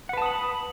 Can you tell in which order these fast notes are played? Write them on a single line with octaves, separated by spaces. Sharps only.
F#5 B4 A5 D#6 B5